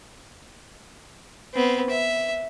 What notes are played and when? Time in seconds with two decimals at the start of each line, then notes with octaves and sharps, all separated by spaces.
1.53 B3 C4
1.89 E5